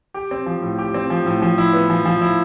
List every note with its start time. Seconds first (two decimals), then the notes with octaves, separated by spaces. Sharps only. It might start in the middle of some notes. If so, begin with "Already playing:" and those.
0.14 G4
0.31 C4
0.46 F3
0.62 A2
0.78 G4
0.94 C4
1.10 F3
1.26 A2
1.42 F3
1.58 E4
1.73 B3
1.90 F3
2.06 F3
2.21 E4